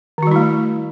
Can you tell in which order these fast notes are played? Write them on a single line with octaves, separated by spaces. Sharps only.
D#3 F#4 G3 E4 A3